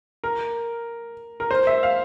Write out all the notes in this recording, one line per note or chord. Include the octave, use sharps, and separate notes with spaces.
A#4
A#4
C5
E5
F5